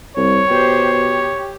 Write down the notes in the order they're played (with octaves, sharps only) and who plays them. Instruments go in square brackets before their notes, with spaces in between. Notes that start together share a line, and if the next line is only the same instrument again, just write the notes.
[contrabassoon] C2 [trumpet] C#5
[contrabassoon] B2 [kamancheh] G4 C5
[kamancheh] G4